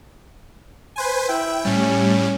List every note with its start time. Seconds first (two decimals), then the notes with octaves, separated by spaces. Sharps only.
0.96 B4 C5 G#5
1.29 E4 G5
1.65 A2 G3 C#4